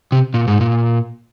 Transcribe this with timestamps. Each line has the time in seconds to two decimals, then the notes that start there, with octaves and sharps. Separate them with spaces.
0.12 C3
0.34 A#2
0.48 G#2
0.61 A#2